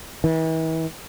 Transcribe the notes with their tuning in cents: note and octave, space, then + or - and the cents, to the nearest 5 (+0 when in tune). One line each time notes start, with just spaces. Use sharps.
E3 -40